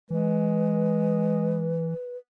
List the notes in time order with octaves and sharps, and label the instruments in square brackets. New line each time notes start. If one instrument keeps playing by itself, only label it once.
[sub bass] E3 [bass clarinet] G#3 [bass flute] B4